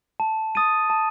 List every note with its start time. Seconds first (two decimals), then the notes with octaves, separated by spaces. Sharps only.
0.20 A5
0.55 D#6 A6 D#7
0.90 A5